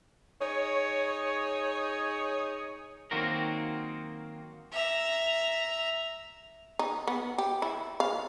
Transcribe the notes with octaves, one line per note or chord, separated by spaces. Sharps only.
D#4 G#4 C#5
D#3 F#3 A#3 C4 F#4 A#4
E5 A#5
D#4
B3
G4
E4
F5